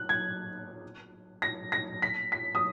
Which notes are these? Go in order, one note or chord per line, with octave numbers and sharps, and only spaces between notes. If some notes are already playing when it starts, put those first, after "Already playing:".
Already playing: F#6
G#6
A#6
A#6
B6
B6
D#6